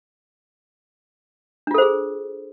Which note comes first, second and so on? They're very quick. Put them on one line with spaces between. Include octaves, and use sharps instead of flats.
D4 F4 A4 C5 G#4